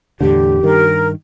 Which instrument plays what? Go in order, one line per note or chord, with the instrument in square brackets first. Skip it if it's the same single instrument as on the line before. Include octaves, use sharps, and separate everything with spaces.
[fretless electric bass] E2 A2 D3 [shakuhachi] G4
[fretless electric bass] G2 D#3 [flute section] A#4